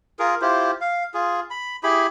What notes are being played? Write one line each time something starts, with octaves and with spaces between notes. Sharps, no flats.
F4 G#4 A#4
E4 F4 G4 C5
F5
F4 G#4
B5
E4 G4 G#4 B5